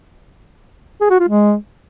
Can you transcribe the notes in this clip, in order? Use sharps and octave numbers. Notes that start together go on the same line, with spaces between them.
G#4
F#4
F4
G#3